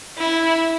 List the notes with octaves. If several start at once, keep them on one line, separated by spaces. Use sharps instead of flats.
E4